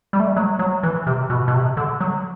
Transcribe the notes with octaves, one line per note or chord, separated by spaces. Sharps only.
G3
A3
G3
F#3
F#3
E3
C3
B2
B2
C3
D3
F#3